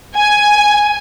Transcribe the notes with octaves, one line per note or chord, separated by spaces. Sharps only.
G#5